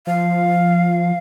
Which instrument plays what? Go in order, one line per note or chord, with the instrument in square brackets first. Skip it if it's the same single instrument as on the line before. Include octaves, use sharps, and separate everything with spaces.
[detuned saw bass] F3 [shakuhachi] F5